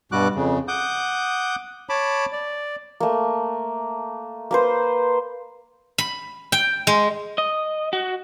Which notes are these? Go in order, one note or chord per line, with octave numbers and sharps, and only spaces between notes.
G2 B2 G3 F#4 D6 F#6
F2 C#3
F#5 D6 D#6 G6
C#5 A5 B5 D6
D5
A3 A#3
A#3 B4 C5
B5
G5
G#3
D#5
F#4